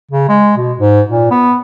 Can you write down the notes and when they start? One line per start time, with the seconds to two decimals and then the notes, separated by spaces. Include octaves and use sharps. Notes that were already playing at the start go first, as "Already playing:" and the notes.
0.11 C#3
0.29 G#3
0.57 B2
0.79 G#2
1.09 A#2
1.31 B3